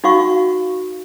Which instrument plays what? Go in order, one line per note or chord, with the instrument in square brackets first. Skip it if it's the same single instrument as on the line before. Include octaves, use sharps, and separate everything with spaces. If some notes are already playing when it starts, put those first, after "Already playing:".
[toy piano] D#4 F#4 F5 C#6